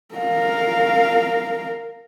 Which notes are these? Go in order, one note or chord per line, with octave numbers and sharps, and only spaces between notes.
A#4 F5